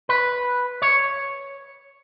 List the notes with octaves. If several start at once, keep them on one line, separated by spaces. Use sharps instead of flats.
B4
C#5